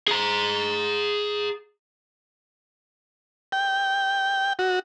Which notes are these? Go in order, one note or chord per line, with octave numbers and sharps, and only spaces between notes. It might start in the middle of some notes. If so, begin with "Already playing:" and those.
G#4 A#5
G5
F#4